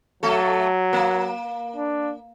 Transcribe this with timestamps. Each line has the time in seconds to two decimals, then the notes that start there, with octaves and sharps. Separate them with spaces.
0.23 F#3 A3 A4
0.93 A#3
1.76 D4